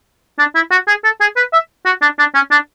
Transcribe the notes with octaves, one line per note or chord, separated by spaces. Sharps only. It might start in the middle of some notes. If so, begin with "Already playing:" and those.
D4
E4
F#4
G#4
A4
G#4
B4
E5
F#4
D4
D4
C#4
D4